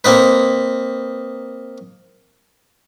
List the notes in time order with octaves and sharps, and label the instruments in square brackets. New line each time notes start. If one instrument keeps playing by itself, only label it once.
[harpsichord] A#3 C4 D#4 B4